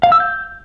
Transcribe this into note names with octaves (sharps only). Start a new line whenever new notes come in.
F5
E6
G6